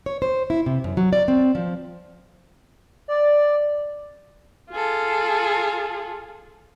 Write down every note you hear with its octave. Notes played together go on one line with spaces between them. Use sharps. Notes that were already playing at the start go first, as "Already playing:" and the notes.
C#5
C5
E4
C3
F#2
F#3
D5
C4
F3
D5
F4 G#4 A4